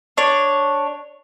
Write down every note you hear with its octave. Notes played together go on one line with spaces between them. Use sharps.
D4 C#5